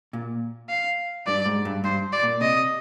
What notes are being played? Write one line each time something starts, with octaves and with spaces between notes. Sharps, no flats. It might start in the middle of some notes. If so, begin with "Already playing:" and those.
A#2
F5
G2 D5
G#2
G2
G2 C5
D5
A#2
C3 D#5